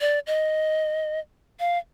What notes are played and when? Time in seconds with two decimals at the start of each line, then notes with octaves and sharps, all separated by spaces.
0.01 D5
0.27 D#5
1.60 F5